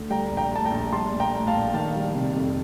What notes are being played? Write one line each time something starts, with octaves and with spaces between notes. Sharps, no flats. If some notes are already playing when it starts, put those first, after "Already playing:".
Already playing: D2
G3 G5 A#5
A#1
G5 A#5
A2 A5
G5 A#5
A#1
G3 A5 C6
A#1
G5 A#5
A2
F5 A5
A#1
D#3 F5 A5
G3
C3
F2